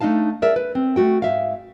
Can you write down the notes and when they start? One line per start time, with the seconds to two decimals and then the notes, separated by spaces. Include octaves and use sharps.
0.01 A3 D4 D#4 F5 A5
0.42 G#4 A#4 D5 E5
0.56 B4
0.75 C4
0.96 A3 F#4 G5
1.22 G#2 E5 F5